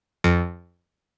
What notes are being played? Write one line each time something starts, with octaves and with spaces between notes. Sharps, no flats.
F2